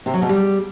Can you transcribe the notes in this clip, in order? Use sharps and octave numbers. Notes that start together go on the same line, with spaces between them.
C3
F#3
B2
G3